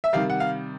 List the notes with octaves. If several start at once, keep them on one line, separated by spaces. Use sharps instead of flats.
E5
C3 D#3 G3 F5
F#5
F5